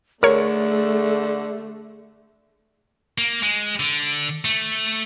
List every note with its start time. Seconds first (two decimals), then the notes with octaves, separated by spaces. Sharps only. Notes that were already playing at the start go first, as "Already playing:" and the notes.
0.23 D3 A3 G#4 A#4 C#5
3.18 A#3
3.43 G#3
3.80 D3
4.45 A3